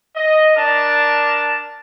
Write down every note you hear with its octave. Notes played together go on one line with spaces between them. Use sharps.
D#5
D4 A#4 A5